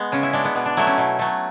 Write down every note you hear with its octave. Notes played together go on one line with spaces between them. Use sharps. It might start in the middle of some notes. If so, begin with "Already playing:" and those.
Already playing: G#3 B3
C#3 C#4
E4
G#3 D4
B3
B2 B3
D4
F#3 A3 E4
C#4
B2
F#3 A3